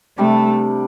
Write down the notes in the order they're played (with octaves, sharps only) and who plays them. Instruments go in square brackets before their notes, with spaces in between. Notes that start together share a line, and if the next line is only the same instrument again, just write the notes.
[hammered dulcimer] C3 G3 D4 [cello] A3